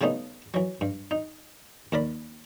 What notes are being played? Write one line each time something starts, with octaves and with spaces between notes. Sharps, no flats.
C#3 G3 A3 B3 D#4
E3 F#3
G2
D#4
D#2 A#4 D5 B5